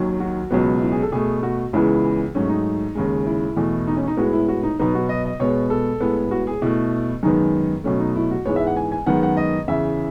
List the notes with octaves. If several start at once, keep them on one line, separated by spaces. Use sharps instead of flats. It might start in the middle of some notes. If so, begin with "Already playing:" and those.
Already playing: D#2 D#3 F#3
F#4
C#2 B2 F#3 B3
E4
G#4
A4
B2 A3 G#4
F#4
C#2 C#3 E3 G#3 B3 E4
G#2 F#3 A3 C#4
D#4
D#2 C#3 G#3
E4
E2 B2 A3
D#4
C#4
D#4
A2 G#3 B3 F#4
E4
F#4
D#4
B2 F#3 B3 D#4
F#4
D#5
D#5
B2 G#3 B3 C#5
A4
A2 G#3 B3
F#4
G#4
B2 A3 E4
F#2 D#3 G#3 B3 D#4
B2 F#3 A3 C#4
D#4
E4
F#4
G#2 E3 G#3 B3 C#5
E5
F#5
G#5
G#5
F#2 D#3 G#3 B3 F#5
F#5
D#5
E2 C#3 E3 E5